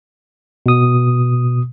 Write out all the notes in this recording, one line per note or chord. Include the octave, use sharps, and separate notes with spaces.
B2 D#6